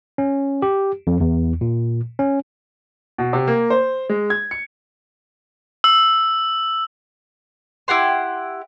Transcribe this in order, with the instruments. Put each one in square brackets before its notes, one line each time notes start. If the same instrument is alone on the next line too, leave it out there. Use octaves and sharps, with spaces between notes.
[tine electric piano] C#4
G4
F2
E2
A#2
C#4
[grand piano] B2
C3
A#3
C5
G#3
G#6
C#7
[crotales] E6
[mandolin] E4 G4 F#5 C6